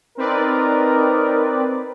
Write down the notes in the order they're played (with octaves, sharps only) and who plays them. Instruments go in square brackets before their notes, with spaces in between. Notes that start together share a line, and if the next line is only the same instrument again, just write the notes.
[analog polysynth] C4 B4 D5 [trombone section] D#4 A#4